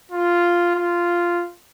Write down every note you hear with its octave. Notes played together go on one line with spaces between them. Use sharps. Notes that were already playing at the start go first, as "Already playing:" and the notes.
F4
F4